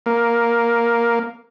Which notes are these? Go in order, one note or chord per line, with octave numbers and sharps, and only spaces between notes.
A#3